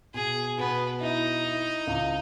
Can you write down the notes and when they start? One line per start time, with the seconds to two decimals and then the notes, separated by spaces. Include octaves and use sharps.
0.14 B2 G#4
0.58 B2 B3
1.01 D#4 E4
1.43 E4
1.87 C#2